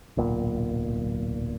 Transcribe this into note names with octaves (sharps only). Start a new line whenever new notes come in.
D1 B1 A#2